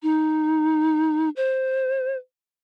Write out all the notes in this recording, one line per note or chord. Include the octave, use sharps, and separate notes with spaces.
D#4
C5